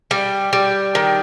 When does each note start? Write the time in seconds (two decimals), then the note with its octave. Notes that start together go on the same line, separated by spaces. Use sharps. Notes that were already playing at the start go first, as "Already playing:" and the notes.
0.11 G3
0.53 G3
0.95 D#3